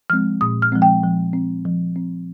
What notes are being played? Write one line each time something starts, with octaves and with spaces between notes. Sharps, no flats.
F3 G#3 C4 F6
A#2 D#6
F6
F3 G#3 C4
G5
F3
C4
F3
C4